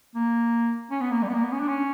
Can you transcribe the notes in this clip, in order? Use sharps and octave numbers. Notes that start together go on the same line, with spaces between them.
A#3
C#4
B3
A#3
G3
B3
A#3
B3
C#4
D4
C#4